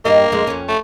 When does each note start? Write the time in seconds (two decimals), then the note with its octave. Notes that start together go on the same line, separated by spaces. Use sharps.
0.05 G2 G3 A#3 D#5
0.32 F2 G#3
0.47 F2 C#4
0.69 A3